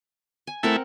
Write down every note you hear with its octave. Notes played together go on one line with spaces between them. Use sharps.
G#5
A3 C4 E4 A#4 F#5